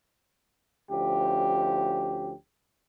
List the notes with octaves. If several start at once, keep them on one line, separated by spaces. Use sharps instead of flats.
D2 F3 C#4 G4